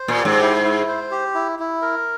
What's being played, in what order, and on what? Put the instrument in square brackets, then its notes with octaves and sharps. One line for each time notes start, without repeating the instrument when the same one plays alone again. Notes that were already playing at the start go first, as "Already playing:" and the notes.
Already playing: [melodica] C5
[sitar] A#2
[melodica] G4
[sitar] G#2
[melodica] E4
E4
C5
G4
E4
E4
A#4